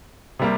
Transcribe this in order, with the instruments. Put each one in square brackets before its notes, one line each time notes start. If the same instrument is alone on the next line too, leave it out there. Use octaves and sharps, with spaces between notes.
[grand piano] C3 G3 A#3